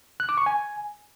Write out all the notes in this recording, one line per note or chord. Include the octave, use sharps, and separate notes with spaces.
F#6
D6
C#6
G#5